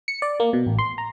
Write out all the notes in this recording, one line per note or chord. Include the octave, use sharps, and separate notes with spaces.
C#7
D5
A#3
B2
A1
C6
A#5